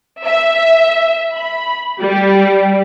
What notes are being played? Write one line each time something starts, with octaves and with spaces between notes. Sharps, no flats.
E5
B5
G3